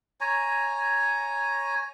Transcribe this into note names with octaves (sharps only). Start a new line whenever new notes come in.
C#5 G#5 A#5